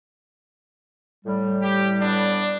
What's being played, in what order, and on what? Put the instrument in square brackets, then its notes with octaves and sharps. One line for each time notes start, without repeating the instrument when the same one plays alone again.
[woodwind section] A2 G3
[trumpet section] G4
B3 D4